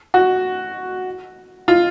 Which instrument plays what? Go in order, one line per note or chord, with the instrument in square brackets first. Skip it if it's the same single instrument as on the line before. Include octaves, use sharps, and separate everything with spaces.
[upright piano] F#4
F4